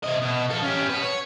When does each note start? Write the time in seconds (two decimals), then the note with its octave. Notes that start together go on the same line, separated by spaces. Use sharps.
0.04 C3 D#5
0.23 B2
0.50 F3 A4
0.63 C#4 G4
0.89 F#4 B4
1.03 C#5